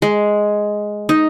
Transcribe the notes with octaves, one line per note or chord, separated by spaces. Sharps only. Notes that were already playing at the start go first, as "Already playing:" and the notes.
G#3
D#4